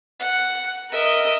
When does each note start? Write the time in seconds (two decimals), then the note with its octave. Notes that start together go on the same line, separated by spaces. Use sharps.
0.20 F#5
0.92 A#4 D#5 E5